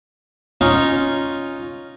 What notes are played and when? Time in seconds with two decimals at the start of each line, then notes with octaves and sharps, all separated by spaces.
0.61 C#4 D#4 F4